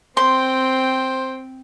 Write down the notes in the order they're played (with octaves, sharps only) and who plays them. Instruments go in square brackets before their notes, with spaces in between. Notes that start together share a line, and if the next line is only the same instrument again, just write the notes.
[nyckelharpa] C4 G5 [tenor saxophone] C5 [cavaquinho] C6